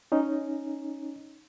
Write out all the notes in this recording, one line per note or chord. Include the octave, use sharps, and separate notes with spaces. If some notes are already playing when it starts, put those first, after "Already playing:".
C#4 D#4